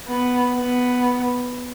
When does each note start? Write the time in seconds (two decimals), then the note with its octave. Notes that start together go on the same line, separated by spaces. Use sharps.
0.08 B3
0.56 B3